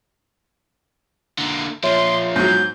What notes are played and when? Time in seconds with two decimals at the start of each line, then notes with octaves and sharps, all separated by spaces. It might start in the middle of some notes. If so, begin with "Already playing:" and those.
1.38 D3 A#3
1.83 A#2 F3 C#5 E5 C6
2.36 G#2 F#3 G6